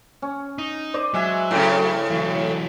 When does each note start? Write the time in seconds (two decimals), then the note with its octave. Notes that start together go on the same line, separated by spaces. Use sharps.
0.22 C#4
0.58 D#4
0.94 C5 D5 D#5
1.14 F#3 G#3 E5 G#5
1.51 A2 C#3
2.11 E3 F#3